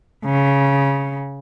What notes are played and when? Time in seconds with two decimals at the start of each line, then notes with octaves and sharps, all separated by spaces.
0.25 C#3